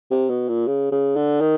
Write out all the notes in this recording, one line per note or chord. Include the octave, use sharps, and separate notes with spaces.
C3
B2
A#2
C#3
C#3
D3
D#3